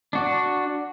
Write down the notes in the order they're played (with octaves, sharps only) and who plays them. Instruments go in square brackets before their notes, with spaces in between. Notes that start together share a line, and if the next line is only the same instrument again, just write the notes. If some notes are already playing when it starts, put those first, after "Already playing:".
[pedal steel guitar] D4 F#4